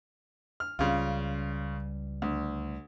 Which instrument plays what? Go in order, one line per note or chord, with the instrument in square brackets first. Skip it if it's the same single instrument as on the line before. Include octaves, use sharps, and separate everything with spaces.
[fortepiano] F6
[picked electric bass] C#2 G3 [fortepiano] C#3 F4
[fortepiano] D2